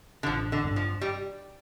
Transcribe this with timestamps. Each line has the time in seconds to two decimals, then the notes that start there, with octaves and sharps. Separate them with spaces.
0.23 D3
0.26 A1 F3
0.52 D3
0.64 G2 G3 D4
0.76 F3
1.01 G3